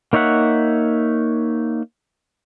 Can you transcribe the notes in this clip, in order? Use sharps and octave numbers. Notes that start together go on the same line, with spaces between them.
A#3 D#4 C#5 E5 F#5